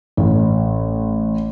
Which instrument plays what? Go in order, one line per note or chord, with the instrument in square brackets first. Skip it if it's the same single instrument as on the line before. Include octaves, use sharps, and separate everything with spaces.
[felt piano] A1